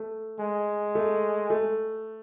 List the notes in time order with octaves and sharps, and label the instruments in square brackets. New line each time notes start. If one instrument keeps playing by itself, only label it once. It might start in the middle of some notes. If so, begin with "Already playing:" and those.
Already playing: [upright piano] A3
[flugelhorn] G#3
[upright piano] A3
A3